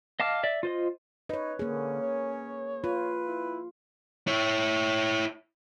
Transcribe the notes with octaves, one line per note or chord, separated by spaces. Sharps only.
D#5 F5 A5 D6 F6
D5 E5
F4 C5 D#5
D#4 B4 C#5
D3 A#3 C#4 G#4
C#5
F4 B4
E4
E4 C#5